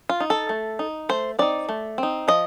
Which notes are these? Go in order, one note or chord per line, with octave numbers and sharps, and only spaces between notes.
F4
D#4
A4
A3
D#4
A3 C5
C4 D#4 D5
A3
C4 D#4
F3 D#5